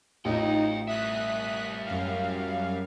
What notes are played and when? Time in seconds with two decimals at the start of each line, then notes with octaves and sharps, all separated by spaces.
0.25 A1 D#4 F4 D#5 F5 G5
0.88 G3 E5 D#6 F#6 B6
1.86 F#2 F5